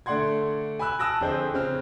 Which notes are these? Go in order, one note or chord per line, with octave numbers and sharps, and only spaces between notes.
D3 A3 D5 F#5 C6 G#6
G#5 B5 D6 E6 F#6
A5 D#6 E6 F#6 A#6 D7
F2 D3 G#4 C5
C#3 C4 F6